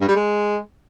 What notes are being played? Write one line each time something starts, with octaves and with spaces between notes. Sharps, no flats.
G2
G3
G#3